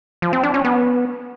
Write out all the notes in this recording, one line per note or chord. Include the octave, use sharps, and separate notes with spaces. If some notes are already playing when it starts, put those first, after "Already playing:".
F3
C4
D4
C#4
B3